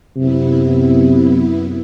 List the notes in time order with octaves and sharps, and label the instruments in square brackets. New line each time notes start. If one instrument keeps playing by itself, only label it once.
[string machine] F#2 B3 E4 [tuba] C3